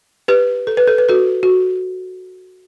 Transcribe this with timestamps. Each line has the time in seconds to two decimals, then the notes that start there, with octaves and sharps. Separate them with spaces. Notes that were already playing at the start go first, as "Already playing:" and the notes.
0.28 G4 B4
0.67 A4
0.77 B4
0.87 A4
0.98 B4
1.09 F#4 A4
1.43 F#4